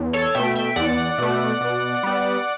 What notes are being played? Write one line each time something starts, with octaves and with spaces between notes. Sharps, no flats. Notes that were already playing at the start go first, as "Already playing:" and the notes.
Already playing: E2
A4 C#5
B2 A3 E5 G5
E5 G5
E2 D5 F#5
B2 A3
B2
G3 B3